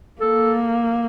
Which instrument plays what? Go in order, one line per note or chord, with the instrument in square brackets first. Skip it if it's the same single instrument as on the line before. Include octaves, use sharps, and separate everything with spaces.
[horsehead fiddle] A#3 [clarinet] A4